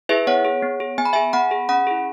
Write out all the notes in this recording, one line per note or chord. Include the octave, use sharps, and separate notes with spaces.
E4 G#4 B4 E5
B3 C#5 F#5
G#4
B3
G#4
B3 G#5
B5
G#4 E5 G#5
B3 F#5 B5
G#4
C#4 F#5 B5
E4 G#4